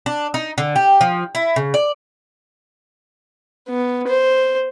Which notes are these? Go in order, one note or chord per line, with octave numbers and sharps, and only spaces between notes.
D4
D#4
D3
G4
F3
E4
C#3
D5
B3
C5